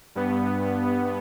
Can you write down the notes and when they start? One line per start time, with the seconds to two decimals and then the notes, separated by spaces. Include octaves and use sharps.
0.15 G2 B3